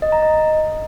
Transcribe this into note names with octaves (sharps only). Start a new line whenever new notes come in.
D#5
A#5
D#5